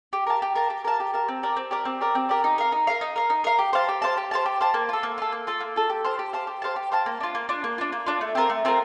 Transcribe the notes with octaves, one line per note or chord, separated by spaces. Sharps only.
G4
A#4 F5 A5
G4
A#4 F5 A5
G4
A#4 F5 A5
G4
A#4 F5 A5
C4
G4 A#4 D5
C4
G4 A#4 D5
C4
G4 A#4 D5
C4
G4 A#4 D5
D#4
A#4 F5
D#4
A#4 F5
D#4
A#4 F5
D#4
A#4 F5
G4
C5 F5 A5
G4
C5 F5 A5
G4
C5 F5 A5
G4
C5 F5 A5
A#3
F4 A4
A#3
F4 A4
A#3
F4 A4
A#3
F4 A4
G4
C5 F5 A5
G4
C5 F5 A5
G4
C5 F5 A5
G4
C5 F5 A5
A#3
D4 F4
A#3
D4 F4
A#3
D4 F4
A#3
D4 F4
A3
C4 F4 A#4
A3
C4 F4 A#4